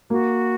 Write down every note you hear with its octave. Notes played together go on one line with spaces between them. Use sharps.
A#3 F#4